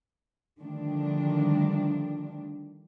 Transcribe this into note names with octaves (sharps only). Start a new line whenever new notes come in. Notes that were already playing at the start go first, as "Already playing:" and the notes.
D3 D#3 F3 G3 A3 D4